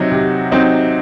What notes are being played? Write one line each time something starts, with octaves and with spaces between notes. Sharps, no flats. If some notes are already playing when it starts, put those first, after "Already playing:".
Already playing: C3 F#3 C4 D#4
C3
F#3 C4 D#4